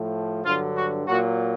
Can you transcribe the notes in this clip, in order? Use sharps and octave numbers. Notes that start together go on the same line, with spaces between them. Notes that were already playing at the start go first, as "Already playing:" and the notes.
Already playing: A2 F3
G2 D3 F#3 F4
F#4
A#2 F#3 F#4